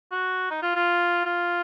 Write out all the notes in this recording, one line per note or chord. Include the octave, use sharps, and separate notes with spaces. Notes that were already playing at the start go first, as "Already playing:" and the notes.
F#4
D#4
F4
F4
F4